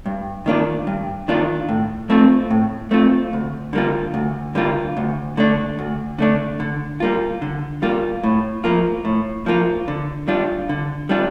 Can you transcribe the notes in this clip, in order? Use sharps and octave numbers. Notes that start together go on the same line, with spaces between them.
G2
D#3 A#3 D4 F4
G2
D#3 A#3 D4 F4
A2
A3 C4 F4
A2
A3 C4 F4
D2
D3 G3 A#3 F4
D2
D3 G3 A#3 F4
D2
D3 A3 D4
D2
D3 A3 D4
D3
G3 A#3 F4
D3
G3 A#3 F4
A2
F3 A#3 F4
A2
F3 A#3 F4
D3
G3 D4 F4
D3
G3 D4 F4